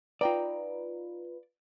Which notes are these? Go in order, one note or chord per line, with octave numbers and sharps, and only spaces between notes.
D#4 F4 B4 D5 G5 A#5